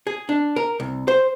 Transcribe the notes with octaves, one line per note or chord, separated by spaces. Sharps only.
G#4
D4
A#4
C2
C5